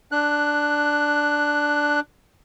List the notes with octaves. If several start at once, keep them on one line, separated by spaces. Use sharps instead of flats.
D4 F#6